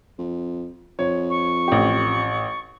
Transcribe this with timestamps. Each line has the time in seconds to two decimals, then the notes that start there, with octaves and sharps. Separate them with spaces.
0.19 F2
0.99 F2 C#5
1.30 C#6
1.68 A1 G4